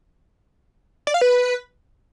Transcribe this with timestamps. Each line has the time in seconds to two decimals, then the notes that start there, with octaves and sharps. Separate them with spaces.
1.07 D5
1.14 F5
1.21 B4